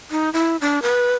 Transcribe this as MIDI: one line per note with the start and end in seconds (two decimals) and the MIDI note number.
0.11 0.30 63
0.33 0.57 64
0.61 0.82 62
0.82 1.14 71